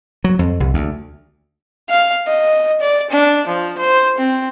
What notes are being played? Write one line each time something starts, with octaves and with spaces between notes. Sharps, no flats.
F#3
F2
C2
D2
F5
D#5
D5
D4
F3
C5
C4